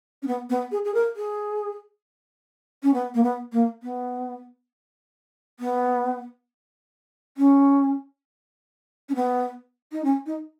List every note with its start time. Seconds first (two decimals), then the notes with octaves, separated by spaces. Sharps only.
0.22 C#4
0.27 B3
0.50 B3
0.72 G#4
0.85 G#4
0.94 A#4
1.16 G#4
2.83 C#4
2.94 B3
3.14 A#3
3.23 B3
3.52 A#3
3.83 B3
5.60 B3
7.37 C#4
9.09 C#4
9.15 B3
9.92 D#4
10.04 C#4
10.26 D#4